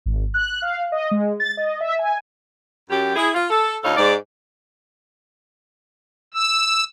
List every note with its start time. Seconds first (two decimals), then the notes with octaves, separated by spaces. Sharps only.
0.06 G#1
0.34 F#6
0.62 F5
0.92 D#5
1.11 G#3
1.40 A6
1.57 D#5
1.81 E5
1.99 G#5
2.90 F#2 G4
3.16 E4 G#4
3.35 F4
3.50 A4
3.83 D2 A2 D#4 A4 C#5 F5
3.97 G#2 D5
6.34 E6